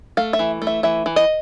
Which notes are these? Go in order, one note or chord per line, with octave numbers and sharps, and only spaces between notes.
A3 F5
E5
E3
A3
E5
E3 E5
E3
D#5